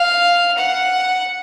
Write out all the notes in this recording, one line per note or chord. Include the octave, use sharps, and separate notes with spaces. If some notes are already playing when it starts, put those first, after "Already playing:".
Already playing: F5
F#5